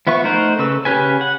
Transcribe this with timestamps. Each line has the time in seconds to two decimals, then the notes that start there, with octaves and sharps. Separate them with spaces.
0.07 F3 B3 E5 F5 C#6
0.24 A3 D#4 A#4 C5 F#5
0.59 C#3 A4 B4 C#6 E6
0.85 C#3 C#4 G4 B4 G#5
1.21 F#5